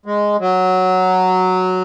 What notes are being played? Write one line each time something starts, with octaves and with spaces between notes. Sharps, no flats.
G#3
F#3